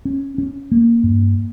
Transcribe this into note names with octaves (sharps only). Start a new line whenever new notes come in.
C#4
C#4
A#3
G2